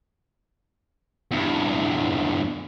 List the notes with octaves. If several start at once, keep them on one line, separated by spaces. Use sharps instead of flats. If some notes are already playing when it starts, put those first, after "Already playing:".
E2 G2